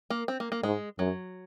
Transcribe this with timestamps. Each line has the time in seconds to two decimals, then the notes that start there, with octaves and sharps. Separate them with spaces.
0.10 A#3
0.28 C4
0.40 A#3
0.52 A#3
0.63 G#2 G#3
0.99 F#2 F#3